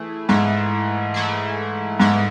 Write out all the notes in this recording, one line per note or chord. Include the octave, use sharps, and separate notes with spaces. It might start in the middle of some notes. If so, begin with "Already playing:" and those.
Already playing: E3 A3 E4 G#4
G#2 E3 A3 E4 G#4
E3 A3 E4 G#4
G#2 E3 A3 E4 G#4